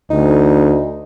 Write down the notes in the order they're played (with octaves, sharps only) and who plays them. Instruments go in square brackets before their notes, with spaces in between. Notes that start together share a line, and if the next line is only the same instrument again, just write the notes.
[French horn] D2 [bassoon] D#4